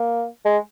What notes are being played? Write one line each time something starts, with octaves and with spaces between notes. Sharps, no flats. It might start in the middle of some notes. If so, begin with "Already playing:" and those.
Already playing: A#3
G#3